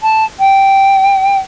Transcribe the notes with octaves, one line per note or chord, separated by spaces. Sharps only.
A5
G5